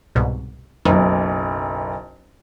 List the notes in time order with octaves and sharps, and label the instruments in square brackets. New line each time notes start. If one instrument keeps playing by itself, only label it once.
[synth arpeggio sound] C2 G#2 B2
[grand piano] F#1 B1 [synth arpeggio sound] F2 D#3